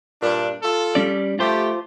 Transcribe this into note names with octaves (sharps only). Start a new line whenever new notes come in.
G2 A#2 D4
F4 A4
G3 C#4 D5
A3 F4 G4 C5